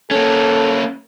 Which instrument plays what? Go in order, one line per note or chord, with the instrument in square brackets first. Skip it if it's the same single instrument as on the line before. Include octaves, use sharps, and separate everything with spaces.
[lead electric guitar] A#3 C#4 [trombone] A4